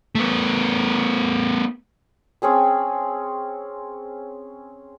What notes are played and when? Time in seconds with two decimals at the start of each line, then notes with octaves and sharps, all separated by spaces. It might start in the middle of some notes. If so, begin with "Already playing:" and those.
0.15 A3 B3
2.42 C4 C#4 G#4 G5